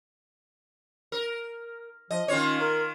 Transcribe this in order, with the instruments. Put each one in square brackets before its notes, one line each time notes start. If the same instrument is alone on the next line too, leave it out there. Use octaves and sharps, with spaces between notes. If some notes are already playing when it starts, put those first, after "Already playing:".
[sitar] A#4
[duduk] F3 [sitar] D#5
[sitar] D#3 F4 C#5 [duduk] C#4
[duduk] A#4